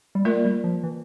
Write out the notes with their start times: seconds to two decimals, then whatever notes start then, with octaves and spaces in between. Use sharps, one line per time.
0.15 G3
0.25 A3 A#3 F4 A#4 D5
0.45 G3
0.64 F3
0.83 E3